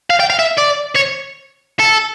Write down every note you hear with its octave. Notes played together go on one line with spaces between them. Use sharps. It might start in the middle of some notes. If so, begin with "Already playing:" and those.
F5
G5
F5
E5
D5
C#5
A4